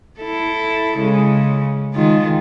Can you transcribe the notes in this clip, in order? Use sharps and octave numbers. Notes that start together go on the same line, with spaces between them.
E4 A4
C#3 G#3
D#3 G#3 F4